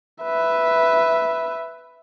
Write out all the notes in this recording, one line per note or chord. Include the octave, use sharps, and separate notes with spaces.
B4 E5